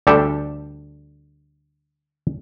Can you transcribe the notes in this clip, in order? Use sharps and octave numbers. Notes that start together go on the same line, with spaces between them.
D2 G3 D4 G4 A4 E5